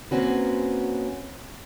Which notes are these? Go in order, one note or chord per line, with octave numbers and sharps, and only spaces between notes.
A#3 C4 C#4 F#4 B4